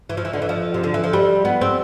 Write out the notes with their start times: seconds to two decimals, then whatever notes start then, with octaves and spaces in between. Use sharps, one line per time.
0.09 E3
0.17 F3
0.25 E3
0.33 D3
0.42 E3
0.49 F3
0.74 C3
0.83 D3
0.94 E3
1.04 F3
1.13 G3
1.45 B3
1.61 C4